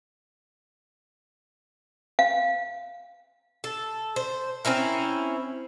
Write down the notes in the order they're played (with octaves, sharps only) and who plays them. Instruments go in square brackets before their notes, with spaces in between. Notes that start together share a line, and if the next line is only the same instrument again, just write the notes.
[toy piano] F5
[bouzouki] A4
C5
C4 C#4 E4 A#4